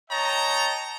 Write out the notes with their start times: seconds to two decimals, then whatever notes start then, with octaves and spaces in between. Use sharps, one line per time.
0.11 C#5 D#5 G5 A5 A#5